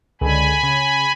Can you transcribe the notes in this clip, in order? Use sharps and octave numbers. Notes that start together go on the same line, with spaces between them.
C#2 D3 G#5 B5
C#3